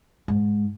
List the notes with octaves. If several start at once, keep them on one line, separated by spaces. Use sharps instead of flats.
G#2